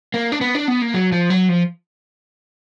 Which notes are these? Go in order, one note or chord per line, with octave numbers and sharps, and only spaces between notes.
A#3
D4
B3
D4
B3
A#3
F#3
F3
F#3
F3